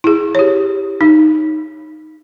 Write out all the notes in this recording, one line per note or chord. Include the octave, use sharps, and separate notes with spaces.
E4 G#4
G4 C#5
D#4